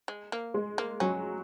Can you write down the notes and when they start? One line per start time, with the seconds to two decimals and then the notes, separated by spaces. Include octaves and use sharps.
0.08 G#3
0.32 A#3
0.54 G#3
0.78 A#3
1.00 F#3 C#4